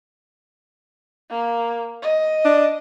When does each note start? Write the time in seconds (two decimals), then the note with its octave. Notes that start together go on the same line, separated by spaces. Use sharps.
1.30 A#3
2.02 D#5
2.45 D4